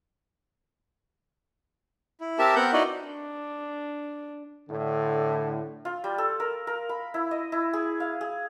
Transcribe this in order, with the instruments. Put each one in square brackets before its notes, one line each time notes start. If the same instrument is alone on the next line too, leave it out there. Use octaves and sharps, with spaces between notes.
[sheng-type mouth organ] E4
C4 G4 A#4 E5 A5
B3 C4 A#4 F#5 G6
D#4 E4 F#4 D5 D#5
[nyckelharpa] D4
[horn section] A2 D3
[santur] F4
G3
A4
A#4
A#4
B5
E4
D#5
E4
G#4
F5
G#4